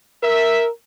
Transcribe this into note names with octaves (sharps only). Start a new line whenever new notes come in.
A#4 E5